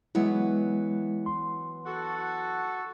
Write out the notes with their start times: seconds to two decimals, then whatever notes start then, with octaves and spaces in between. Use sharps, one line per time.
0.15 E3 F#3 G#3 B3 E4
1.26 C6
1.86 F#4 A4